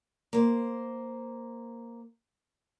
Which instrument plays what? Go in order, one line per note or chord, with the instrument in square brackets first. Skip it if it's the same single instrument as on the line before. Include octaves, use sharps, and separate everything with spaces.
[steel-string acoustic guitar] A#3 C5